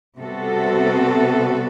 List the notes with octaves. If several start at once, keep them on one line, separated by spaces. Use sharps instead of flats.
C3 G3 B3 F#4 A4